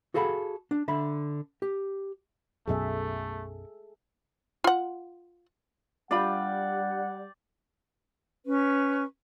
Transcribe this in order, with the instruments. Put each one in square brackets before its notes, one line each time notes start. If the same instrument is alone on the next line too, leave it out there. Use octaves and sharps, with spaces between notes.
[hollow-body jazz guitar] F#4 G#4 A4 F5 A#5 B5
D4
D3 E5 B5
G4
[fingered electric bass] B1 F#2 B2 [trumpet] A3 [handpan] G#4 A4 E5
[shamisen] F4 F#5
[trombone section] G3 [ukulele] D4 F4 B5 [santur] D5 G5 [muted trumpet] F#5
[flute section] C#4 B4 C#6